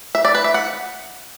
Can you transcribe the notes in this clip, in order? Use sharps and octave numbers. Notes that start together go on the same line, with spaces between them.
E5
D5
B4
E5
F#5